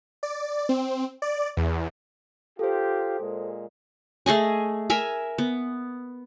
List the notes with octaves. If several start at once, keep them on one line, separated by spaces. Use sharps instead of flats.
D5
C4
D5
E2
F4 G4 A4 C5
A#2 G#3
A3 G#4 D#5 G#5
A#4 E5 G#5
B3